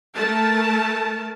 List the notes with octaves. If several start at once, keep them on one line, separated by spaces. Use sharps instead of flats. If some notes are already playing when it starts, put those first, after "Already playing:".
A3 A#4 A5